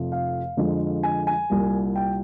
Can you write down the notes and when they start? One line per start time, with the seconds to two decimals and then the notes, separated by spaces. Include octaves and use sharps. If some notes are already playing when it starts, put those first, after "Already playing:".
Already playing: F1 F2 C3 F3
0.12 F5
0.57 F2 D3 F3 G#3
1.03 G#5
1.27 G#5
1.50 C2 A#2 G3
1.96 G5